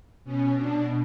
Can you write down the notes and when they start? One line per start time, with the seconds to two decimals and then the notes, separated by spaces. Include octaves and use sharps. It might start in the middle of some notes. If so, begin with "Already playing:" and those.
0.24 B2 C#4
0.55 D4